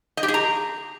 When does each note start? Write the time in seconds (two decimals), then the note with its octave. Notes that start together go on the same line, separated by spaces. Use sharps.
0.17 D#5
0.23 G4
0.28 G#4
0.34 A#5